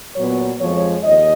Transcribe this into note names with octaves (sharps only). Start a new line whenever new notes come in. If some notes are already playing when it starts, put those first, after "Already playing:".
A#2 F#3 B3 C#5
F2 F3 G#3 C#5
D#2 D#5